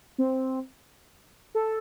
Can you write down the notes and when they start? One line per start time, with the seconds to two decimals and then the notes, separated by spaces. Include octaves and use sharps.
0.18 C4
1.55 A4